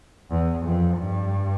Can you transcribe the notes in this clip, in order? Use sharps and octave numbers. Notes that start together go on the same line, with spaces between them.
E2
F2
G2